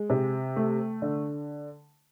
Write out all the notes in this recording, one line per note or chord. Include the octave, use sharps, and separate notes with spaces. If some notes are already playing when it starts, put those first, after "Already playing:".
Already playing: G#3
C3
A3
D3